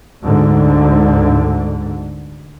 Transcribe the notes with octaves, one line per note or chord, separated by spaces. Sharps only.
D2 G#2 D3